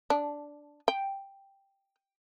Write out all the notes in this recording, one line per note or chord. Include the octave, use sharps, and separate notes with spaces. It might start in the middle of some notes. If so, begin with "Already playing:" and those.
D4
G5